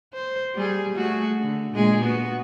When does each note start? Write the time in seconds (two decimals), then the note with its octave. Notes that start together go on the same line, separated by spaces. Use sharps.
0.14 C5
0.55 G3 G#4
0.95 A3 F#4 G#4
1.40 D3
1.73 A#2 G#3 G#4
2.02 B3 F#4